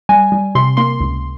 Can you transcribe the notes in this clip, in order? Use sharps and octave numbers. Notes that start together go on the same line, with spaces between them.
G3 G#5
G3
C3 C6
A#3 C6
C#2